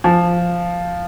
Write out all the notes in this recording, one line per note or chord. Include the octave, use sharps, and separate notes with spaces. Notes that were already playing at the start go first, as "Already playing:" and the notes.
F3